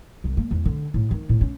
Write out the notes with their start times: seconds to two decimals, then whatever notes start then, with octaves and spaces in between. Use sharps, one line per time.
0.24 C2
0.37 A#3
0.51 E2
0.65 D3
0.94 A2
1.11 D#3
1.29 A2
1.41 C#4